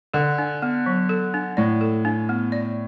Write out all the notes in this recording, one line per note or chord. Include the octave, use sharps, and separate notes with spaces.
D3 A4
D4
B3
F#3
A4
D4
A2 D5
A4
D4
B3
D5